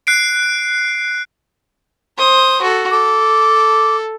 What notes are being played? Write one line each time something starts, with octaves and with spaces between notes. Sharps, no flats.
F#6 C7 D7
C5 D#6
F#4 A4
A4 D6